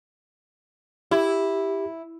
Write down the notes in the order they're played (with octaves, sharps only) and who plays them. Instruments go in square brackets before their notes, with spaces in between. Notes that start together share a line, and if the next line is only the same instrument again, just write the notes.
[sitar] E4 [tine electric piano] G4